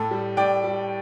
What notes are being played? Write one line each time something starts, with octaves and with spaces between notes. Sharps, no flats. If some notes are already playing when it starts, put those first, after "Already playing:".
Already playing: A2 A4
G3
A2 D5 G5
G3